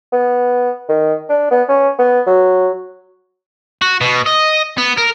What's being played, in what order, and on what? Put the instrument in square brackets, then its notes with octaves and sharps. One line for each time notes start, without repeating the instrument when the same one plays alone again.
[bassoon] B3
D#3
D4
B3
C#4
B3
F#3
[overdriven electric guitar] F#4
B2
D#5
B3
A#4